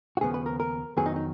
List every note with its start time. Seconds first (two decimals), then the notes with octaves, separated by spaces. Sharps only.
0.17 F#4
0.21 D#2 C#3 F3 B3 G#4
0.34 B4
0.46 A#4
0.60 A#4
0.97 F2 D#3 F#3 B3 G#4
1.06 D#4
1.16 D#4